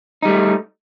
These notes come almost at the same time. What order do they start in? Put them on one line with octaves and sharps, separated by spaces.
D#4 G3 A3